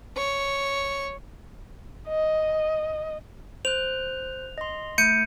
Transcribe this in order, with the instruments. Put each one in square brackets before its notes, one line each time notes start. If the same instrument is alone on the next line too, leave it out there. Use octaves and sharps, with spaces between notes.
[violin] C#5
[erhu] D#5
[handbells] C5 F#6 [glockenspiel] F7
[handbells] D#5 C6
[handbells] A3 [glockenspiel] G6 C#7 D#7